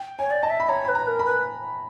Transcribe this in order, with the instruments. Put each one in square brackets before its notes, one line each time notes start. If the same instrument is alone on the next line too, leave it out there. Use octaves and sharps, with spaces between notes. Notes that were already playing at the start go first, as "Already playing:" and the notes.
Already playing: [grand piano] G5
[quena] C#5 [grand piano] G#5
[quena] D5
[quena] D#5 [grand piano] A5
[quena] E5
[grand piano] B5
[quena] C#5 [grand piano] A#5
[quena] B4 [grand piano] B5
[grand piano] A#5
[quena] A#4
[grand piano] B5
[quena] B4